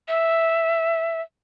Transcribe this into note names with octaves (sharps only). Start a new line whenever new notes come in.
E5